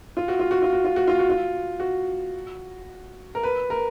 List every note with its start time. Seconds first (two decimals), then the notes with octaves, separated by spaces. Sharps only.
0.17 F4
0.28 F#4
0.39 F4
0.51 F#4
0.62 F4
0.73 F#4
0.84 F4
0.96 F#4
1.07 F4
1.19 F#4
1.30 F4
1.80 F#4
3.35 A#4
3.43 B4
3.70 A#4